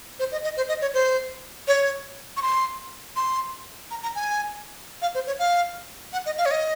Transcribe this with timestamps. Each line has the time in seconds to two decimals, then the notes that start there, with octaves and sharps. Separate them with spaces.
0.19 C5
0.32 D#5
0.44 D#5
0.57 C5
0.69 D#5
0.81 C#5
0.94 C5
1.68 C#5
2.37 C#6
2.42 C6
3.16 C6
3.91 A#5
4.03 A#5
4.15 G#5
5.02 F5
5.15 C5
5.27 C#5
5.39 F5
6.13 F#5
6.26 D#5
6.38 F5
6.46 C#5
6.51 D#5